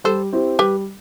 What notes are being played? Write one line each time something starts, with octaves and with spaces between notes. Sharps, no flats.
G3 A4 C5
C4 E4 G4
G3 G4 B4